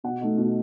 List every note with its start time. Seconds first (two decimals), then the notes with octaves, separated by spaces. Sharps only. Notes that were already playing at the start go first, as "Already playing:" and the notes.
0.04 B2 F#5
0.21 A3 D#4
0.38 B2